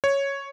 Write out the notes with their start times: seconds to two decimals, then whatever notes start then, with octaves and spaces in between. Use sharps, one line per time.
0.04 C#5